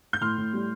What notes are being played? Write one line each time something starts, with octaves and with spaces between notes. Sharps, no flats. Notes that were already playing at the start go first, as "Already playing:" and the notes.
G6
A2 C6 F6
A2
G3